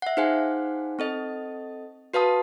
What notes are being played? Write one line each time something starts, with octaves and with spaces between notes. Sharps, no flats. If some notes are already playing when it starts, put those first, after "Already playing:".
E5 F#5
D#4 G#4 C5 F5 F#5 G#5
C4 A4 D#5
F#4 B4 F5 A5 D#6